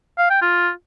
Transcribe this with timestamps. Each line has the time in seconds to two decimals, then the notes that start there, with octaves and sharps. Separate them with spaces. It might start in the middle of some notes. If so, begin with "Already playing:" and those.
0.18 F5
0.30 G5
0.41 F4